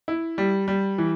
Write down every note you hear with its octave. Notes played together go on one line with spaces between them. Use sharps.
E4
G3
G3
E3